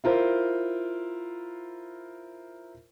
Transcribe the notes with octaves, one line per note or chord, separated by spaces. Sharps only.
E4 F4 A#4 C5